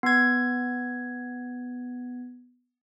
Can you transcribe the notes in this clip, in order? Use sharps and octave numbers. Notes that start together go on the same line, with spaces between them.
B3 G#6